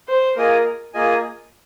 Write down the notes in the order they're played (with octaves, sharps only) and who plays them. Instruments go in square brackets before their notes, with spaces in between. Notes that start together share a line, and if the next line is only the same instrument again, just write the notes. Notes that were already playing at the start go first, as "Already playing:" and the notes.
[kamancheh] C5
[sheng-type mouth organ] A#3 F4 G#4 D#5 G#5 [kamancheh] A#4
[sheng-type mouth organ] A#3 F4 G#4 D#5 G#5